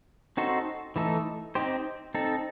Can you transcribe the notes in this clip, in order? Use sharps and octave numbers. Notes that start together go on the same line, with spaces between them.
C4 D#4 F#4 A4 C5
E3 A3 D#4 A4
C4 D#4 G4 C5
C4 D#4 A4